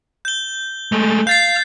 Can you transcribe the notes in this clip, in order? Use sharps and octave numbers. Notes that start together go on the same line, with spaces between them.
G6 G7
G#3 A3
F5 G6 A6 C7